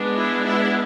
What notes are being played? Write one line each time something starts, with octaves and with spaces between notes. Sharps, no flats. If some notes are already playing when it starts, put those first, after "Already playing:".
Already playing: G#3 B3 D4
E4
E4